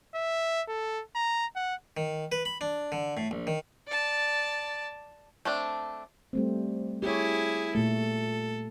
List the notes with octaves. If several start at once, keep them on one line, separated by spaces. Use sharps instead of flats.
E5
A4
A#5
F#5
D#3
B4
B5
D4
D3
A2
A#1
D#3
D5 A5
A3 C4 D4
G3 A3 C4
E4 G4 G#4 C#5
A#2 A3 A4